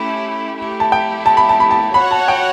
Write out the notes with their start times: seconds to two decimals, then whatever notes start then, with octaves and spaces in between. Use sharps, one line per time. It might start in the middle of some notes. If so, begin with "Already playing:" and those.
Already playing: A3 C#4 E4 G4
0.57 A3 E4 G4
0.80 A5
0.92 G5
1.26 A5
1.37 B5
1.49 A5
1.60 B5
1.71 A5
1.94 F#4 C#5 F#5 B5
2.11 A5
2.28 G5